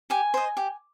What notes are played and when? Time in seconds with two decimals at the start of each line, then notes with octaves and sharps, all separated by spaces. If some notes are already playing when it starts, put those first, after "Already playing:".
0.10 G4 G#5
0.34 C5 D#5
0.57 G4